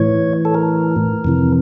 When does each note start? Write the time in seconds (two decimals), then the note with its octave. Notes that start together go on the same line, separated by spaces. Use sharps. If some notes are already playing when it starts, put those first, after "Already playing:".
Already playing: A2 E3 C#5
0.45 A4
0.54 A#4
1.25 F2 C3 E3